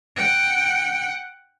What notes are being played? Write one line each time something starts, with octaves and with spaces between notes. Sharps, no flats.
F#5 G5